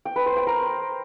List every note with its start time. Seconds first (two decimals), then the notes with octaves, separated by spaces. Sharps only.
0.05 G5
0.16 B4
0.26 C5
0.36 G5
0.47 A#4